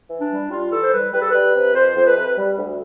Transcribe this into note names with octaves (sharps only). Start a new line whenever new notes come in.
E3
D4
G3
G3 F4
E3 A4
C5
G3 B4
G3 B4
A4
G3 B4
C3
F2 C5
F2
B4
C3
G3
D2